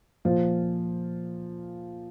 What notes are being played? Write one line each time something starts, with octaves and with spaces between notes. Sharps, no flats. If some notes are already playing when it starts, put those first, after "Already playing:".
A#2 F3 F4